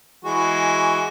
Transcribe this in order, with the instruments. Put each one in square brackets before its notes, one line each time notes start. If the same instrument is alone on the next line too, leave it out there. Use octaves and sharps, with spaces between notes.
[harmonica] E3 G#3 F#4